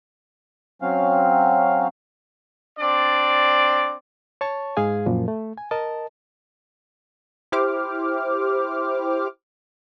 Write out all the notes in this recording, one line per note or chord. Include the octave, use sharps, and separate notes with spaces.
F#3 C4 C#4 F5
C4 D4 D5
C#5 A5 C#6
G#2 G#3 G#4 F5 G#5
F#2 A#2 F3
A3
G#5
A#4 D#5 A5
E4 G4 C5 D6 F6